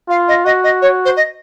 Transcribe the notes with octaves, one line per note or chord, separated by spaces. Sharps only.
F4 F5
D#5
F#4 D#5
D#5
C#5
C5
D#5